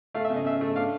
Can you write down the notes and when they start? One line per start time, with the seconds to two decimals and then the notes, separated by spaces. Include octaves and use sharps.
0.14 A3 F5
0.25 E5
0.30 C#3
0.36 D#5
0.45 C#3 E5
0.61 A3
0.76 D4 F5